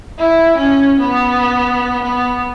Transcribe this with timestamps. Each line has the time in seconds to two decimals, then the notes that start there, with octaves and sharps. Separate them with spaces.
0.18 E4
0.57 C#4
1.00 B3
2.02 B3